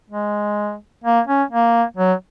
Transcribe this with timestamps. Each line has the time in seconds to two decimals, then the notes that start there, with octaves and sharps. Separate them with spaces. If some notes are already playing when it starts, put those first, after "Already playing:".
0.10 G#3
1.04 A#3
1.27 C#4
1.51 A#3
1.97 F#3